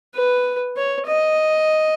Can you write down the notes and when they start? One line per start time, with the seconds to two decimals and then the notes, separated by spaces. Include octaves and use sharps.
0.15 B4
0.77 C#5
1.07 D#5